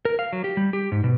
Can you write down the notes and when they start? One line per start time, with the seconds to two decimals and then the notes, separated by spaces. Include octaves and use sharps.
0.05 A#4
0.19 F5
0.33 F#3
0.44 G4
0.57 G3
0.73 G4
0.92 G#2
1.04 B2